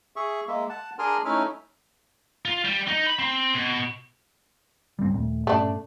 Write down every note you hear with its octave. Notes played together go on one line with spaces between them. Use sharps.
G#4 E5 C#6
G#3 A#3 E5
F#5 A5
D4 G#4 A#4 G#5 C6 F6
A3 C#4 D#4 E4 E5 F6
F4
G3
D#4
B5
C4
B2
G#1 C#2 G2 G3 C4
D#2 A#2 A3
G2 B2 A3 C#4 D4